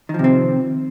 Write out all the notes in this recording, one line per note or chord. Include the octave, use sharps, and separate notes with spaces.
C3 D#3 F3 C4